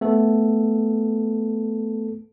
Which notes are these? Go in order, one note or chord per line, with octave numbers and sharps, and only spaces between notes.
A3 B3 A4